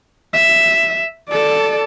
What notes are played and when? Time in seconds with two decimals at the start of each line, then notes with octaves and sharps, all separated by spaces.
0.33 E5
1.29 A4 D5